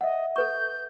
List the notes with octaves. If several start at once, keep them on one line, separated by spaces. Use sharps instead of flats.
D#5 E5 F#5
A4 B4 C#6 G6